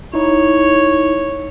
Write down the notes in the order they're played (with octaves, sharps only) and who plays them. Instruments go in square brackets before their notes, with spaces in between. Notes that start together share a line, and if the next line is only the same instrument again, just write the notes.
[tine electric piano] D#4 E4 [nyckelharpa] C#5